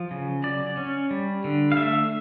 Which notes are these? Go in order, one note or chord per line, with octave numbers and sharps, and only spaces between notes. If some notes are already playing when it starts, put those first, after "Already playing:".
Already playing: F3
C#3
F#3 D5
C#4
G3
D3
F5
A3 E5